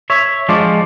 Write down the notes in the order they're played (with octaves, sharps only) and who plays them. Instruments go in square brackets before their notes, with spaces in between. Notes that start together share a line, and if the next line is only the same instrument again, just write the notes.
[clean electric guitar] C#5 E5
F3 G#3 D4 F4 D5